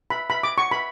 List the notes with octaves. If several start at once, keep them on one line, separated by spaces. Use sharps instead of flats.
B5
B5
D6
C#6
B5